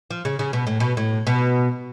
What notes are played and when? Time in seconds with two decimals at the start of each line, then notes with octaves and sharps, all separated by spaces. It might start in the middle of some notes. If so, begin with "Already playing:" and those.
0.10 F3
0.25 C#3
0.39 C#3
0.53 B2
0.67 A2
0.80 B2
0.97 A2
1.27 B2